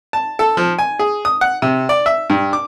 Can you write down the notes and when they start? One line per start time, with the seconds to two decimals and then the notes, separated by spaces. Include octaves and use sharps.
0.13 A5
0.39 A4
0.57 F3
0.79 G#5
0.99 G#4
1.25 D#6
1.41 F#5
1.62 C3
1.89 D5
2.06 E5
2.30 G2
2.53 D6